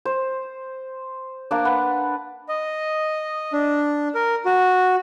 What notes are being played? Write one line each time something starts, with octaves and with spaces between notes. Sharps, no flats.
C5
A#3 D4
B4 F#5
D#5
D4
A#4
F#4